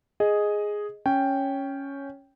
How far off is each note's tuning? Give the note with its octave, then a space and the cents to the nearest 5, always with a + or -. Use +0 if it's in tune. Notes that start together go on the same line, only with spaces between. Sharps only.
G#4 +0 D#5 +0
C#4 +0 C#5 +0 G5 +0